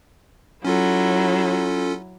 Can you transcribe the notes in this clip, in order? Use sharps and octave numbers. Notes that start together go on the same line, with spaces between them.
F#3 C#4 E4 F4 A4